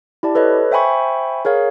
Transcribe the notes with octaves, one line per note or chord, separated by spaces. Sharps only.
E4 G4 D5 A5
A4 B4 C#5 D#5
C5 E5 G5 G#5 B5 C#6
G#4 A#4 C#5 F5